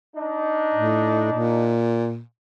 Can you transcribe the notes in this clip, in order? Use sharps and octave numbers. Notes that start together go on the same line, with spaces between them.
D4 D#4
A2
A#2